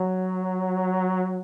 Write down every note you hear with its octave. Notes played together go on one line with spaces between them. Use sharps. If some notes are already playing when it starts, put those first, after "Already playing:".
Already playing: F#3